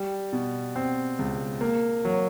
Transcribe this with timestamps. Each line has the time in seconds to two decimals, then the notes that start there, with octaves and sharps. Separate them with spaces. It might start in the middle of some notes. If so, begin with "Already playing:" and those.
Already playing: G3
0.33 B2
0.76 C4
1.19 C#2
1.61 A#3
2.05 F#3